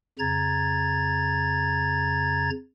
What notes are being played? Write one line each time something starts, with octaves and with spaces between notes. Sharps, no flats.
F2 C#3 A#5 G#6 A6